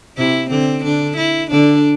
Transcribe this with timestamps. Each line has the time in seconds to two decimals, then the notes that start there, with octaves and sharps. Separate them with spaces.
0.17 C3 E4
0.50 D3 C4
0.84 D3 D4
1.17 E4
1.51 D3 D4